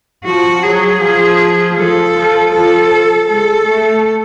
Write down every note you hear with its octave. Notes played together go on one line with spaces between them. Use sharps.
F3 F#4
F#3 G#4
F3
F3 A4
F3
F3 A4
G#3 A4
A3